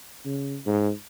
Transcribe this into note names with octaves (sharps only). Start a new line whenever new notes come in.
C#3
G#2